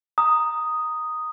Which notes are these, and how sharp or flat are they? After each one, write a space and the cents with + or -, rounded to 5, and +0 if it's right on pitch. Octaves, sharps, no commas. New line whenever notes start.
A#5 +0 D#6 +0